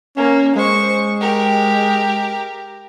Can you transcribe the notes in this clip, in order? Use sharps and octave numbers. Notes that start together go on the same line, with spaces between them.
A#3 C#4
G#3 C5 C#6
G4 A#4